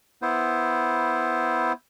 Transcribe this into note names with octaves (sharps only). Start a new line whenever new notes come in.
B3 E4 C5